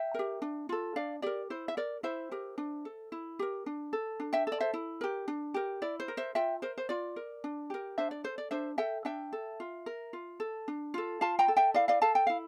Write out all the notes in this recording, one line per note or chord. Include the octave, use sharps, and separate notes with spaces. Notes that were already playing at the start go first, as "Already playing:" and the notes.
Already playing: E5 G5
G4 A#4
D4
F4 A4
D4 D5 F5
G4 A#4 D5
E4 C5
E5
A#4 D5
E4 C5 E5
G4 A#4
D4
A4
E4
G4 A#4
D4
A4
D4
E5 G5
A4 D5
C5 E5
E4
G4 A#4
D4
G4 A#4
E4 D5
C5
A#4
C5 E5
F4 E5 G5
A#4 C5
C5
F4 D5
A#4
D4
G4 A#4
D4 C5 E5
D5
A4 C5
D5
D4 C5 E5
A4 E5 G5
D4 E5 G5
A4
F4
A#4
F4
A4
D4
F4 A4
F4 F5 A5
G5 A#5
A4
E5 G5
E4 D5 F5
D5 F5
A4 F5 A5
G5
E4 F5